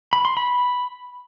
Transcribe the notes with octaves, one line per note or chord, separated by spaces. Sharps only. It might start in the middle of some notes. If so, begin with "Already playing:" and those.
B5
C6
B5